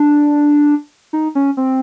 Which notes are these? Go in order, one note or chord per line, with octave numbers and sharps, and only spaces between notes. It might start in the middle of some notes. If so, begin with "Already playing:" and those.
Already playing: D4
D#4
C#4
C4